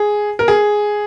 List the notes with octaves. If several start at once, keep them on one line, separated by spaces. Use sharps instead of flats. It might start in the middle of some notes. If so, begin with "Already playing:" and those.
Already playing: G#4
A#4
G#4